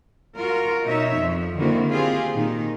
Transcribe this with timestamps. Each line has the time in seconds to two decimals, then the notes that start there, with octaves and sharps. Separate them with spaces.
0.37 F4 F#4 A#4
0.86 B2 D#4 C#5 E5
1.15 F2 F3
1.58 D3 D#3 A#3 C4 E4 F#4
1.90 C4 F4 G4 G#4
2.34 A#2 D#3 D#4